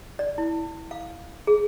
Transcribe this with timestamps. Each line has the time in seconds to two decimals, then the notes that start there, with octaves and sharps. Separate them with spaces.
0.19 D5
0.38 E4
0.91 F5
1.47 G#4